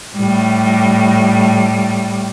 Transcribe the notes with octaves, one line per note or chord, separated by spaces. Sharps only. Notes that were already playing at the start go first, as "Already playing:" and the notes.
A2 G3